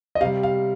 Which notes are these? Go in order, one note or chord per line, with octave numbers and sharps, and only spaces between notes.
D#5
C3 G3 F5
F5